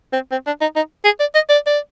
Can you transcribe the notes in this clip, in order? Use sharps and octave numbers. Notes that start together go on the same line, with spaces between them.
C4
C4
D4
D#4
D#4
G#4
D5
D#5
D5
D5